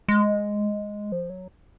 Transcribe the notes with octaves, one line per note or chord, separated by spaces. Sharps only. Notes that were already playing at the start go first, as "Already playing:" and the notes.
G#3
F3
F#3